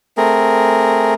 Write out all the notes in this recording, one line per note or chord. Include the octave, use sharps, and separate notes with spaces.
A3 C4 G#4 A#4